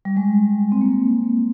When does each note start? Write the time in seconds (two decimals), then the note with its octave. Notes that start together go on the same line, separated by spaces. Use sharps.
0.05 G3
0.17 G#3
0.72 C4
0.81 A#3